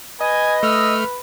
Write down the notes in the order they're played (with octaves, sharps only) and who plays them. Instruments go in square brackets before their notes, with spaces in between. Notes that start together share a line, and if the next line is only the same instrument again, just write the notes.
[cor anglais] B4 [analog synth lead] D#5 [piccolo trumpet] G#5
[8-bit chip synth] A3 F6 [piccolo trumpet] E6